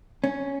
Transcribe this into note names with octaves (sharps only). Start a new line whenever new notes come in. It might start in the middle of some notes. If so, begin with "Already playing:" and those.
C#4